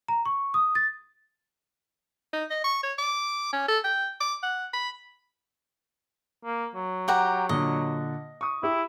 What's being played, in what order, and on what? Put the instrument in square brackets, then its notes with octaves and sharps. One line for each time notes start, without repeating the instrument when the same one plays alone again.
[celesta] A#5
C#6
D#6
A6
[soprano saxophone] D#4
D#5
C#6
C#5
D6
C#4
A4
G5
D6
F#5
B5
[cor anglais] A#3
F#3
[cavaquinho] G4 F#5 A#5 [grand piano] G5
[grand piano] A#2 D3 [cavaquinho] D#5
[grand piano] C#6 D#6
[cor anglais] E4 [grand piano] G4